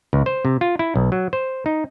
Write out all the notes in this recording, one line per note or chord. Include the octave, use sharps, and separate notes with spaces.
C#2
C5
C3
F4
E4
B1
F#3
C5
D#4